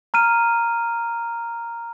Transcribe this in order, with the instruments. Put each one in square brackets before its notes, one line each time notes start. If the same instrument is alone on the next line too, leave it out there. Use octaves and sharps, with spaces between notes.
[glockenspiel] A#5 F6 D#7